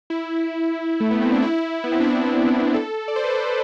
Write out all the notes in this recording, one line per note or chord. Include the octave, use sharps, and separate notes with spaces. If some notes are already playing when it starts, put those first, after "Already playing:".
E4
A3
B3
C4
D4
E4
B3
C4
D4
E4
A4
D5
C5
B4
C5